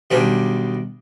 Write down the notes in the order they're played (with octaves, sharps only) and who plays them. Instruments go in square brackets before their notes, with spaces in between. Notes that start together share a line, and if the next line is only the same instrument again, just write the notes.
[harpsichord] B1 D#3 G3 D4 G#5